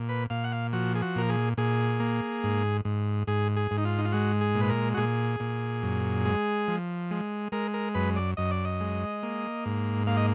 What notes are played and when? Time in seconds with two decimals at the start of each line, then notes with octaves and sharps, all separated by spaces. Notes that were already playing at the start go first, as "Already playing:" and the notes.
Already playing: A#2
0.09 B4
0.30 A#2 F5
0.44 F#5
0.52 F5
0.73 F3 F#4
0.95 G#4
1.02 F#4
1.16 A#2 A#4
1.29 G#4
1.57 A#2 G#4
2.00 A#3
2.44 G#2
2.85 G#2
3.27 G#2 G#4
3.57 G#4
3.71 G#2
3.78 D#4
3.85 F4
3.98 D#4
4.05 F4
4.12 G#3 F#4
4.41 G#4
4.55 A#2
4.61 B4
4.69 A#4
4.94 F#4
4.97 A#2 G#4
5.40 A#2
5.83 F#2
6.25 G#3
6.68 F3
7.11 G#3
7.52 G#3 A#4
7.74 A#4
7.95 F#2 B4
8.16 D5
8.37 F#2 D#5
8.51 D5
8.65 D#5
8.81 G#3
9.23 A#3
9.66 G#2
10.07 A#3 F5
10.17 D#5